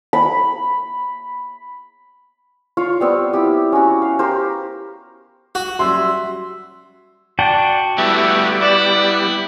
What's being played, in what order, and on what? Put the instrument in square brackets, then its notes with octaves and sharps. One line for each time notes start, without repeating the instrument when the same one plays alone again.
[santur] B5
F4 C#5 F5
G3 B3 C4
E4 G4
C#4 F#4
F5
G4 A#4 C5
[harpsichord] F#4
[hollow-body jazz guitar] F#3 G3 C#4 [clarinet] E5 [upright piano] C6
[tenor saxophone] D4 [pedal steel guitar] F#4 G5 A5
[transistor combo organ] G3 B3 [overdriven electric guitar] A3 G4 [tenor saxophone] E4
[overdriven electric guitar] E4 [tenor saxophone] D5